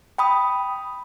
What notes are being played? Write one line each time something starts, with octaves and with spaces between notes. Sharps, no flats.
G5 B5 D#6